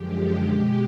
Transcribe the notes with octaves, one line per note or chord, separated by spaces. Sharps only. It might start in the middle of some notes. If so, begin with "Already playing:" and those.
Already playing: F#2 D3 F3 G#3 G4
B2 G#3